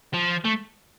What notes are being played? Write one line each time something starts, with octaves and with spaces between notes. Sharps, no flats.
F3
A3